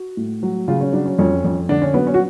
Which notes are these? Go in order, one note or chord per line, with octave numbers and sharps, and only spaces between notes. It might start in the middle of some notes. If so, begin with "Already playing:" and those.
Already playing: F#4
A2
F#3
C#3 F4
C#4
F#3 D4
C#4
F2 C#4
F2
D3 D4
C#4
F#3 B3
C#4
F#4